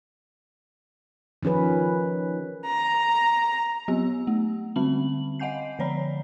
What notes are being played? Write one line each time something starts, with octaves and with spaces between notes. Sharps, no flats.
D#3 F3 C#4 G#4 B4
A#5
F#3 B3 G4 E6
A3
D3 G3 C4 B5 F#7
D#5 F5 F#5 G#5 G6 C7
D3 F3 C#5 D5 A#5 B5